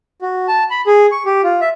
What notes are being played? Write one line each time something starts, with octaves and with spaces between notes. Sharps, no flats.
F#4
A5
B5
G#4
C#6
G4
F4
E5